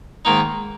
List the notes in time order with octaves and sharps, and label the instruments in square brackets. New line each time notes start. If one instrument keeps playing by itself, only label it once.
[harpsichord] G#2 D#3 A#3 D#4